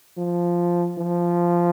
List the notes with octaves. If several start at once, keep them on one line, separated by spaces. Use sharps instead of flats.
F3
F3